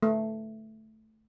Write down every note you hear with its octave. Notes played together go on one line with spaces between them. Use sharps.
A3